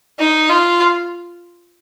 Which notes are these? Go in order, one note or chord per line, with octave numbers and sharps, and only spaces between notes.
D#4
F4